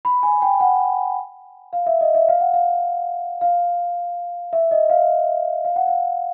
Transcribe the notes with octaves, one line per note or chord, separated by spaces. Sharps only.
B5
G#5
G5
F#5
F5
E5
D#5
E5
F5
F#5
F5
F5
E5
D#5
F5
F5
F#5
F5